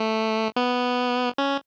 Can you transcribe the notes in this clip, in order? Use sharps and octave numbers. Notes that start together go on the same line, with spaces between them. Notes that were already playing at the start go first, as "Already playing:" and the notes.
Already playing: A3
B3
C#4